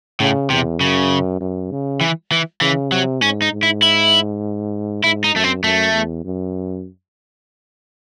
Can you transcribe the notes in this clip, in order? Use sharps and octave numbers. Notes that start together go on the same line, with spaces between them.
A2 C#3
E2 C3
F#2 C#3
F#2
C#3
E3
E3
C#3 E3
C3 F#3
G#2 C#4
D#4
G#2
E4
E4
G#2 E4
D#4
F#2 A3
C4
F#2 A3
E2
F#2